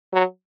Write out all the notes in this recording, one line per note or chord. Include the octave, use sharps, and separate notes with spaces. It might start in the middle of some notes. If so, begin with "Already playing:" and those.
F#3